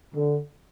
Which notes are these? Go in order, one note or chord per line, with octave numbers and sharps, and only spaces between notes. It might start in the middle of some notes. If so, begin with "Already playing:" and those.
D3